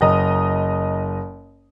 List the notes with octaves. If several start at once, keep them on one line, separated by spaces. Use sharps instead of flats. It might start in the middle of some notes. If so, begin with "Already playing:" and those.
F#1 D#5 A#5